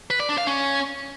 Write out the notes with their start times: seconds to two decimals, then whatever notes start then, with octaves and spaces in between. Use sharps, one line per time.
0.10 B4
0.20 D5
0.29 D4
0.38 F5
0.47 C#4